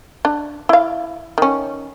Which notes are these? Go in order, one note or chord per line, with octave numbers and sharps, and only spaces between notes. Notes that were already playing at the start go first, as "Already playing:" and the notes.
D4
E4 F5
D#3 C#4